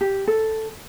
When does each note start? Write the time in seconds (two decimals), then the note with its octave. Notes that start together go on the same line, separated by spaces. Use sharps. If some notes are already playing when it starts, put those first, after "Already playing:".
0.01 G4
0.27 A4